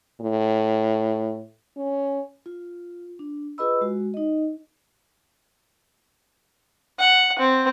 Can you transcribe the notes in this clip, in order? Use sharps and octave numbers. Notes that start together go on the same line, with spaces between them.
A2
C#4
F4
D4
F4 G#4 B4 D#5 B5 E6
G#3 F#4
D#4 D#5
F#5
C4